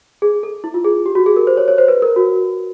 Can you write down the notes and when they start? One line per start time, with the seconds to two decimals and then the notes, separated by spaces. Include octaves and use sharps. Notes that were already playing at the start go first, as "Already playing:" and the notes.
0.22 G#4
0.43 A4
0.64 E4
0.74 F4
0.84 G#4
1.06 G4
1.15 F#4
1.26 G#4
1.36 A#4
1.47 C5
1.57 C#5
1.68 C#5
1.78 C5
1.88 B4
2.02 A#4
2.16 F#4